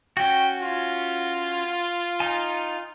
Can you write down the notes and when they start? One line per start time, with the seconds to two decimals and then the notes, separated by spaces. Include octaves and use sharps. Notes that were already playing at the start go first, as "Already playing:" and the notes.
0.17 C#4 F#4 G5
0.62 F4
2.20 D#4 G#5